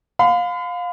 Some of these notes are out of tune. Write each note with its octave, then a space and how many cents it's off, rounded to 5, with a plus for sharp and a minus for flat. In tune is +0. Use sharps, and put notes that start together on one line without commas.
F5 +20 B5 +45